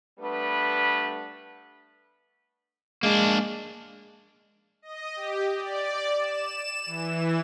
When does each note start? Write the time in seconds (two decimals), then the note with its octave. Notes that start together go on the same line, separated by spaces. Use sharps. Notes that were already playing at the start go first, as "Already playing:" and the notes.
0.20 G3 A3 B3 D4 B4
3.03 G#3 A#3 D4
4.82 D#5
5.16 G4
5.57 D5
6.20 E7
6.86 E3